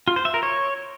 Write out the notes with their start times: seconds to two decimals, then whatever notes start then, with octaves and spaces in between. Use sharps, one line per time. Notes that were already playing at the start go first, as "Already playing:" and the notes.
0.08 F4
0.16 C5
0.25 E5
0.34 A#4
0.43 C#5